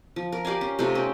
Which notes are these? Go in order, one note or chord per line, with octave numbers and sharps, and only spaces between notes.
F3
A#4
G4 D5 F5 G#5
C#4
C3 A3 D#4 F4
C4 C#4 G4